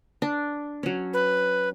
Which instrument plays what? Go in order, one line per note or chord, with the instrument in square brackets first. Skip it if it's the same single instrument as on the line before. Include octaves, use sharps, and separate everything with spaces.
[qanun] D4
F#3 C#4
[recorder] B4